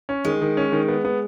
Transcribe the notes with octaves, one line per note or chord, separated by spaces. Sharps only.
C#4
D#3 G#3
D#3
C#4
D#3
B3
B3